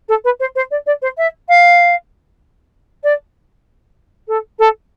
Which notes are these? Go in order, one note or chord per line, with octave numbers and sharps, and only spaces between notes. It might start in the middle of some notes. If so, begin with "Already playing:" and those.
A4
B4
C5
C5
D5
D5
C5
E5
F5
D5
A4
A4